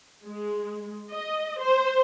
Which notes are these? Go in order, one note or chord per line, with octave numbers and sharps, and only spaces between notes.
G#3
D#5
C5